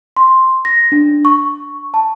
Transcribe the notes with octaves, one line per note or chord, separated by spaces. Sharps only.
C6
A#6
D4
C#6
A5